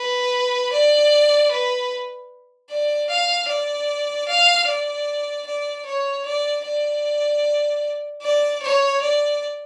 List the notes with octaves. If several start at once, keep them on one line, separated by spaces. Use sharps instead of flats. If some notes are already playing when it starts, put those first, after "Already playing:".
Already playing: B4
D5
B4
D5
F5
D5
F5
D5
D5
C#5
D5
D5
D5
C#5
D5